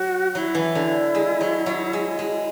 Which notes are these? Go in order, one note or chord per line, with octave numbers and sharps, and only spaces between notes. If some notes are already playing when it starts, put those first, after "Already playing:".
Already playing: F#3 F#4
F#3 E4
E3
D3
G#3
F#3
F#3
G#3
G#3